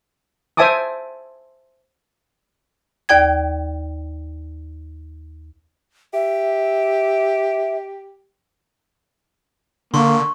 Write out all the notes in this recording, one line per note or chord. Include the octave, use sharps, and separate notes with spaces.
C5 E5 G#5 A5 D6 D#6
D#2 D5 G5 G#6
G4 E5
D3 A#3 C6 C#6